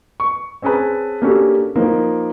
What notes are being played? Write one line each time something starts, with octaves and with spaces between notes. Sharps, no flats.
C#6
C4 C#4 G#4 B4 A5
A#3 C#4 D4 F#4 G4 A4
F3 A#3 D#4 A#4 B4